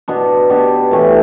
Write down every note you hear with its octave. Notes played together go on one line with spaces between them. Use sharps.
B2 B3 D4
B2 B3 D4 G4
A2 E3 A3 G4